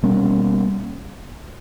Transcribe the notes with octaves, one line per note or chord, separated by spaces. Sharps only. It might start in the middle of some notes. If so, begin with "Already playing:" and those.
B2 G3 A#3 C#4